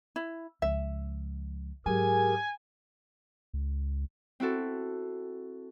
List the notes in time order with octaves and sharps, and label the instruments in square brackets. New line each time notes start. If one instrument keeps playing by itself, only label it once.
[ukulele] E4
[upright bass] C#2 F3 [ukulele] E5
[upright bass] G#2 F#3 [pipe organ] G4 G#4 A#4 [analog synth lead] G#5
[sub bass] C#2
[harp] C4 E4 F#4 A4